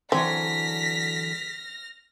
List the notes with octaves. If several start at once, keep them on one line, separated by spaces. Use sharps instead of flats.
D3 E3 F#3 C4 F6 A#6 B6